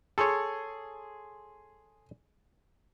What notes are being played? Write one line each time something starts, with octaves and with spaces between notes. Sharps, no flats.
G#4 A4 C#5 C6